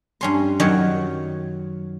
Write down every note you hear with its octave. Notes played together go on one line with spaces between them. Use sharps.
G2 C#4 C6
F#2 D#3 F#3 C#5